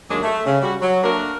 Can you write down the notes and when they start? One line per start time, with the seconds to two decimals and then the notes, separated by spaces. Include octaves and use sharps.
0.10 D#2 F#3 G#3 A#3 D4 G#4
0.23 A3
0.46 C#3
0.62 G3 F#4
0.81 F#3
1.04 A3 A#3 D4 F#4 A#4